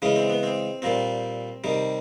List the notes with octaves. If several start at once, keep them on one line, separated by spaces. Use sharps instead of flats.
C#3 E3 G#3 C#4
C4
B3
C4
A#2 G3 C4
C3 D#3 G3